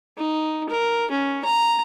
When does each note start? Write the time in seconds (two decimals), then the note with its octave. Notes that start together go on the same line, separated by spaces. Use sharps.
0.17 D#4
0.69 A#4
1.11 C#4
1.44 A#5